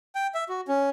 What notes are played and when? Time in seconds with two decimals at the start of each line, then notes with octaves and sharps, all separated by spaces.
0.15 G5
0.34 E5
0.49 F#4
0.68 C#4